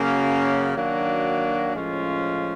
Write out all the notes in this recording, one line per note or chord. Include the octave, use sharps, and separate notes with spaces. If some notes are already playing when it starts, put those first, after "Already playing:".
Already playing: F#2 C#3 F#3 A#3 C#4
D#3 F#3 A#3 D4 F#4
A2 F3 G#3 C#4 F4